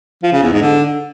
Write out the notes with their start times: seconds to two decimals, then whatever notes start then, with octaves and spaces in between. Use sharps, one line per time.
0.23 F3
0.33 C#3
0.43 E2
0.52 G#2
0.62 D3